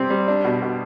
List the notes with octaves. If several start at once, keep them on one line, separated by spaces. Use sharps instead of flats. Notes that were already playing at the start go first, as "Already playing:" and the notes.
Already playing: C3 G3 C4
G3
D4
B2
B2